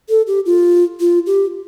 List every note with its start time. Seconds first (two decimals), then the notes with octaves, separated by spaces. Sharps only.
0.09 A4
0.27 G4
0.46 F4
1.00 F4
1.26 G4